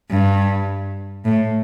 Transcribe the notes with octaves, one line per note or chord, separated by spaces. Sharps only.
G2
A2